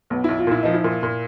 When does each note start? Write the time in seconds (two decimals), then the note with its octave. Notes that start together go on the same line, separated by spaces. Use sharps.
0.10 B1 B3
0.24 B1 E4
0.38 F4
0.47 A#2 E4
0.63 F3 D#4
0.74 E4
0.84 A#2
1.03 A#2